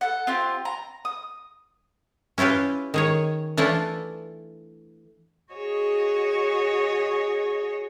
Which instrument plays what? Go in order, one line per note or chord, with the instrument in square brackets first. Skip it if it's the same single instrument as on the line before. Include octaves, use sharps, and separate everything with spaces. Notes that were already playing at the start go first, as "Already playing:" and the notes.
[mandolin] A4 F#5
C4 F4 G4
A#5
D#6
[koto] C#4 E4 F4 G4 B4
D#3 G#4 C#5
E3 A3 D4 E4 F4
[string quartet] F#4 G#4 C#5 D#5